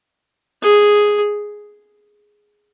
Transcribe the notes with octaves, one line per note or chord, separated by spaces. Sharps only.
G#4